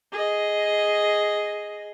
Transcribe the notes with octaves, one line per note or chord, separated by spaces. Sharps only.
G#4 D#5